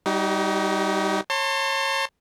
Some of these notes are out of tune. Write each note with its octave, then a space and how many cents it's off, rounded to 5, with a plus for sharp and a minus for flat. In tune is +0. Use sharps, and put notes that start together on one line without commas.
G3 +0 D#4 +20 F#4 +45
C#5 -25 A5 +35 C6 +0